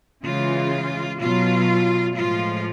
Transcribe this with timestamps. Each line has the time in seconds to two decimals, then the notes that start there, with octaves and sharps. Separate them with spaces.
0.24 C#3 E3 G#3 F4
1.20 B2 F#3 F4
2.15 A2 F3 G#3 F4